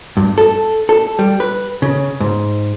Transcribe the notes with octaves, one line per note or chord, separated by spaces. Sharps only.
G2
A4
A4
G3
B4
C#3
G#2